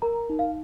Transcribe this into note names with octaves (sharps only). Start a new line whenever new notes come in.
A#4 A#5
D#4
F5